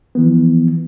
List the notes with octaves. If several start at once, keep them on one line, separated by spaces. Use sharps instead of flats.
E3 F3 B3